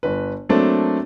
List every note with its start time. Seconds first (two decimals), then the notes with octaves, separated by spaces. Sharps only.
0.03 G1 B4
0.49 F#3 A3 A#3 C4 D4